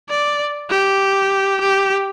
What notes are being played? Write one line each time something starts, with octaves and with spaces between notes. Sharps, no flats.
D5
G4
G4